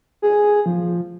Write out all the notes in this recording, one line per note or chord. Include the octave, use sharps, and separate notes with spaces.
G#4
F3